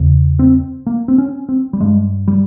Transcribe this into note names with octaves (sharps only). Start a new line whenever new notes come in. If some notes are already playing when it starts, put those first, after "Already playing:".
Already playing: E2 C#3
C4
A#3
C4
C#4
C4
G3
G2 G#3
G3